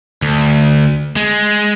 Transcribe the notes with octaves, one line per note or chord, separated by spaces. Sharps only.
D2
G#3